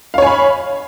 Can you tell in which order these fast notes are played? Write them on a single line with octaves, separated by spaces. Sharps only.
F5 C#5 G#5 B5